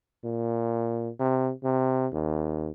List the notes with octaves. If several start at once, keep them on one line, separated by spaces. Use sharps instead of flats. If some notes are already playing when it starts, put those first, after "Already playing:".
A#2
C3
C3
D#2